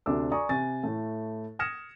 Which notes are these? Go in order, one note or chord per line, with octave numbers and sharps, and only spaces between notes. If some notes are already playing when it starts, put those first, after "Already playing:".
D2 C3 D4 D6 E6
D5 G#5 A#5 C#6 D#6
C3 G#5 A6
A2 A3
D#6 F6 G#6 A#6 C#7 E7